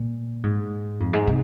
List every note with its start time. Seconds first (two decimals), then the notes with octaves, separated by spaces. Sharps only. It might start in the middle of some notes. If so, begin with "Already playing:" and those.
Already playing: A#2
0.43 G#2
1.00 F2
1.13 G#2
1.27 C3